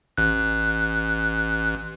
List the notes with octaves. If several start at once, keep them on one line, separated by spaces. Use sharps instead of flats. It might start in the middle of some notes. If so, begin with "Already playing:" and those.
A1 F#6